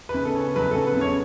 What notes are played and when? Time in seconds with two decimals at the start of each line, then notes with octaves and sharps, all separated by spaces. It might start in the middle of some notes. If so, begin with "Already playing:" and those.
0.09 B4
0.14 C#3
0.25 A4
0.35 C#4
0.56 F#3 B4
0.71 C#3 A4
0.87 B4
0.97 C#3 C#5